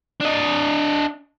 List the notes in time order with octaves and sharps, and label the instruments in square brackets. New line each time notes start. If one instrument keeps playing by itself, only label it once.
[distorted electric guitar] D4 D#5